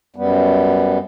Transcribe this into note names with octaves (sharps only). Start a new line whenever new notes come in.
F#2 G3 B3